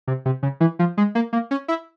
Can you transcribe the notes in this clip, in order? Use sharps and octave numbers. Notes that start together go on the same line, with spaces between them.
C3
C3
C#3
E3
F3
G#3
A#3
A#3
C#4
E4